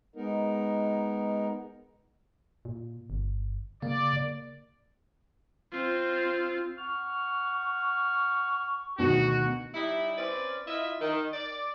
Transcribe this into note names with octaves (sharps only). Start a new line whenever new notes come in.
G#3 B3 D#4 A#4
A#2
G1
C#3 A#3 D5
C4 F4
F#5 C#6 F6
D2 B2 D#3 F#4
G3 D#4 E4
C4 C#4 B4 D5
E4 F4 D#5 E5
D#3
D5